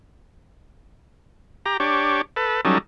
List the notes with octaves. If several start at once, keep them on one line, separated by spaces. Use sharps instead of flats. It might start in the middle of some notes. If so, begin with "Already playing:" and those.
G4 A#5
D4 G4 C#5
A4 B4
F#3 G3 C#4 D#4 A4